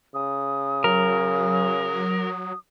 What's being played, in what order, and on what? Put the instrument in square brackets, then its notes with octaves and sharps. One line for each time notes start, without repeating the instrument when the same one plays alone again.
[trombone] C#3 [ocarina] D#6
[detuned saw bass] F#3 [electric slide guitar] A#4